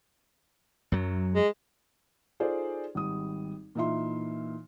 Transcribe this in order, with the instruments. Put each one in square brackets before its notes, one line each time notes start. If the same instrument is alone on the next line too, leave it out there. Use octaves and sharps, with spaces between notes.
[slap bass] F#2 F#3
[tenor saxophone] G#3
[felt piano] D#4 F4 G#4 A4 C5 D5
G#1 G3 D#6
A#2 E3 D#4 F4 E5 C6